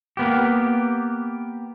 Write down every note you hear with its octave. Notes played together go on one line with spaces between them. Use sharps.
A#3 B3 G4